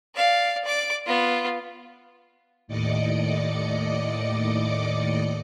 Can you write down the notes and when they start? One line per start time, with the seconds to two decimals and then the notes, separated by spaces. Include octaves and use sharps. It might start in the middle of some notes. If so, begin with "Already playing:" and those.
0.15 D5 F5
0.64 D5 D6
1.06 B3 F4
2.67 D#2 A2 D5 D#5 D6 C#7